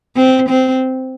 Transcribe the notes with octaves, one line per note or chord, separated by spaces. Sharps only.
C4
C4